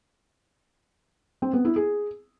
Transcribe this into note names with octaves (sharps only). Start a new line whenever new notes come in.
C4
B3
E4
G#4